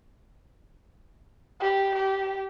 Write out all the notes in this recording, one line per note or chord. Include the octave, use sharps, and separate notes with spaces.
G4
G4